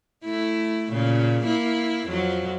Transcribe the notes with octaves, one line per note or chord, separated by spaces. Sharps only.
A3 E4
A#2 C#3
A#3 E4
F2 F#3